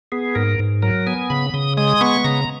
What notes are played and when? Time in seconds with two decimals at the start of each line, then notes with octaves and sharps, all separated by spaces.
0.12 B3 G#4
0.35 G#2 A#4
0.59 G#2
0.83 F#3 A#4
1.07 B3 G#5
1.30 C#3 B5
1.54 C#3 D#6
1.77 G#3 D#6
2.01 B3 C#6
2.24 C#3 A#5